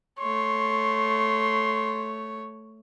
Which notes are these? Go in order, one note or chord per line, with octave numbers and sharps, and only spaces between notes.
A3 C#5 C6